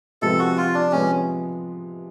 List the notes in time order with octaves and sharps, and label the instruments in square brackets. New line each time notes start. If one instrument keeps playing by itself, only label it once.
[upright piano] C3 F3 G#3 B3 [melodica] A4
[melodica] F#4
F4
D4
[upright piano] C3 F3 G#3 B3 [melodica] C#4